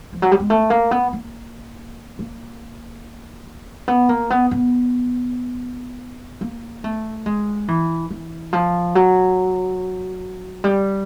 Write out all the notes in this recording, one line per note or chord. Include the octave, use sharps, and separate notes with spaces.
F3
F#3
G3
G#3
A3
A#3
B3
A#3
A#3
B3
A#3
B3
B3
A#3
A3
G#3
E3
E3
F3
F#3
G3